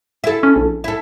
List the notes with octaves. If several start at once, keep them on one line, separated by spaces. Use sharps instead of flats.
E4 A4
C#4
A#1
E4 A4